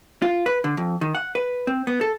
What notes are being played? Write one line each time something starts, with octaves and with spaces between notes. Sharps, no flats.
F4
B4
D3
F2
D#3
F#5
B4
C4
B3
A4